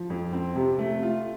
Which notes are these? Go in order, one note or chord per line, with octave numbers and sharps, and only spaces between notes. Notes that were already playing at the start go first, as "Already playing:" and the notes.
Already playing: F3
F2
C4
C3
A3
F4